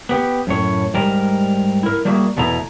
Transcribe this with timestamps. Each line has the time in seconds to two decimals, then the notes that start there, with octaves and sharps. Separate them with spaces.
0.09 B3 G4
0.47 F#2 A2 C#5
0.94 G#2 G3 A#4
1.83 E4 A#4
2.05 G3 A3 A#3 F#4 G#4 E5
2.37 E2 B2 A3 B3 E4 A#5